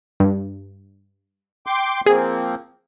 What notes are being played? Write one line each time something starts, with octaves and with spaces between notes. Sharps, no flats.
G2
G5 C6 D6
F3 A#3 C4 G#4